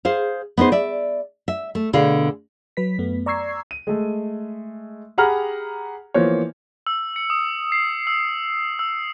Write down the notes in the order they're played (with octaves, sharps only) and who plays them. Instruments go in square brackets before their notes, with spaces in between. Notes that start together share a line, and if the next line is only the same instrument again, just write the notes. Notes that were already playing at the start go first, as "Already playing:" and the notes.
[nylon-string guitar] G#4 C5 F5
B3 D#4 G#4 C5
D5 E5
E5
A3
B2 D3 G#4 F5
[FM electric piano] F#3 B4 B6
F#2 A3 B3
D5 A#5 C#6 E6 G#6 C7
[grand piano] D#7
G#3 A3
G4 G#4 F#5 A#5 B5 F6
E3 F3 A#3 B3 C5 C#5
[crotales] E6
C#7
D#6
C7
E6
E6